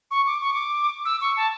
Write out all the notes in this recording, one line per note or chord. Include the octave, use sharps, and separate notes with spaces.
C#6
D6
C#6
D6
E6
C#6
A5